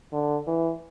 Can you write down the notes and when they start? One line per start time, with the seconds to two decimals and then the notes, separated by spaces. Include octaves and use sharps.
0.13 D3
0.47 E3